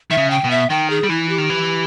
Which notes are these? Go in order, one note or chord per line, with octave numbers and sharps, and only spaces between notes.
D#3 E5
C#3
G5
B2
E5
D#3 G5
G#4
G3
E3 E4
G4
D#3
E3